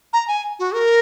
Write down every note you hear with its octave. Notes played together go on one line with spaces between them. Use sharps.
A#5
G#5
F#4
A#4